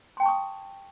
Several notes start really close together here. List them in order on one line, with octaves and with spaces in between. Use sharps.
C6 G5 A5 C#6 D#6